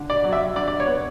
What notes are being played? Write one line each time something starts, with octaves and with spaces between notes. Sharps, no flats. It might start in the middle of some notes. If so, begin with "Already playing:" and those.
Already playing: D3
D5
F#3
E5
D3 D5
D5
C#5
B3